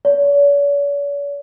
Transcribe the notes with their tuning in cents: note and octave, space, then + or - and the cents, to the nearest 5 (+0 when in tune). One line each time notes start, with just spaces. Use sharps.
C#5 +45